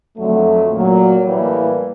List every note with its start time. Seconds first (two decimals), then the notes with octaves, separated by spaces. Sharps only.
0.17 F2 D3 F#3 A3
0.71 A#2 F#3 A#3
1.25 A2 E3 G3 A#3